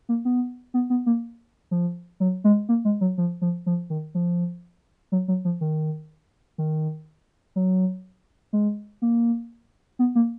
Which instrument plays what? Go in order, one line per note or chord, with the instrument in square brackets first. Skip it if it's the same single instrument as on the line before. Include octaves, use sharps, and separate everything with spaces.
[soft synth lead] A#3
B3
B3
B3
A#3
F3
F#3
G#3
A#3
G#3
F#3
F3
F3
F3
D#3
F3
F#3
F#3
F3
D#3
D#3
F#3
G#3
A#3
B3
A#3